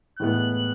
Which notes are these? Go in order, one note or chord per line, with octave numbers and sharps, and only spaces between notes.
A2 E3 G#3 B3 F#6